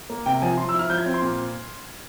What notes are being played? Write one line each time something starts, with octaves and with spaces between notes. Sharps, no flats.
A#3
C3 G5
F3 G#5
F3 C6
E6
E4
F6
F3 G6
G#6
C4
C6
A#2